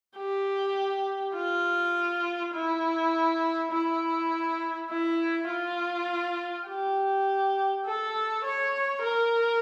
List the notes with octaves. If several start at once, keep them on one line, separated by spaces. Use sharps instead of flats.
G4
F4
E4
E4
E4
F4
G4
A4
C#5
A#4